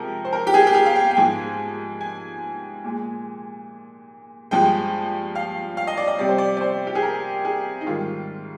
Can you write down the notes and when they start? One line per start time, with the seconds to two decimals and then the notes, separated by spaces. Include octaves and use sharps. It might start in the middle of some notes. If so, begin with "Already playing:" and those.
Already playing: C3 F3 G#3 A#4
0.25 C5
0.33 A#4
0.47 G4
0.54 G#4
0.67 G4
0.74 G#4
0.86 F5
0.96 G5
1.11 G5
1.16 G#2 F3 G#3 G#5
2.01 G#5
2.84 A#2 G#3
4.51 G2 F3 G#3 G5
5.35 F5
5.77 F5
5.87 D#5
5.97 D5
6.08 D#5
6.19 C3 G3 D5
6.29 C5
6.38 D5
6.57 D5
6.61 C5
6.87 G4
6.95 G#4
7.03 A#4
7.45 G#4
7.81 D#4
7.87 G#2 D#3 G3 F4